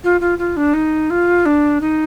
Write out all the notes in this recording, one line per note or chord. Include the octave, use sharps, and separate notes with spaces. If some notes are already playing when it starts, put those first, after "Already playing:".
F4
F4
F4
D4
D#4
F4
D4
D#4